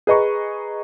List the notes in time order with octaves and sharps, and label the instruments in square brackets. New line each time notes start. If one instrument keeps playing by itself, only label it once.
[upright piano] G#4 B4 D#5 A#5 C#6